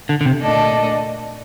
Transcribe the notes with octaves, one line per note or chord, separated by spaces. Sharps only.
D3
D3
C3
A#2 A3 D4 A4 D#5